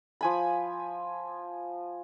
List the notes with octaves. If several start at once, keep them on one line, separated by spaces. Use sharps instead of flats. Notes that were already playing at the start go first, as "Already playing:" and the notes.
F3 G#5 B5